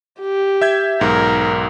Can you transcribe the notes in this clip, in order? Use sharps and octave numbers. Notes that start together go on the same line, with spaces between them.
G4
E5 G6 G#6
B1 G#2 A#4